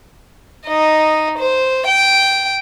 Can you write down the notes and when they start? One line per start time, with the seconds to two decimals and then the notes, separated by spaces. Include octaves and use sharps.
0.67 D#4 D#5
1.38 C5
1.87 G5